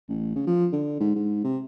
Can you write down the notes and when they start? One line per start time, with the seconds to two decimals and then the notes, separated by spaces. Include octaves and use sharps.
0.08 A1
0.36 C#3
0.47 F3
0.72 D3
1.00 G#2
1.16 G#2
1.44 C3